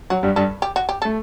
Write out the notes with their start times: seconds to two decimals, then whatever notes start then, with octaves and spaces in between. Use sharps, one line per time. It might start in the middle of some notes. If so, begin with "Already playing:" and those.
0.10 F#3 F#4
0.23 G2 G3
0.36 G2 G3 A4
0.62 G4
0.76 F#4
0.89 G4
1.02 A3 A4